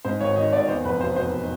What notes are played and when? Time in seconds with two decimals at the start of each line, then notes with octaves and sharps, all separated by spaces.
0.05 G#2 C5
0.20 G#1 C#5
0.36 D#3 D#5
0.53 G#1 D5
0.68 E2 C5
0.85 F1 B4
1.00 B2 C5
1.16 F#3 C5